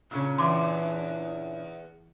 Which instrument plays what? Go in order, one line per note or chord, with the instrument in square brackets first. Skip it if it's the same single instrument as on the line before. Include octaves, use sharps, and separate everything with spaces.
[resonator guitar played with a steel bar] A#2 C#3 C#4 [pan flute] D4
[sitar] E2 [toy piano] C6 D6